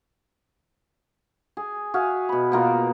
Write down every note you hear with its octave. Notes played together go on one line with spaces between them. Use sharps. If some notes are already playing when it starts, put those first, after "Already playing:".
G#4
F#4 G#4 E5 F5
B2 B5
B2 A#3 F4